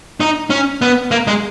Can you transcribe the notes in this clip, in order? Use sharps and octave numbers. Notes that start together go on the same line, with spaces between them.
D#4
C#4
B3
A#3
G#3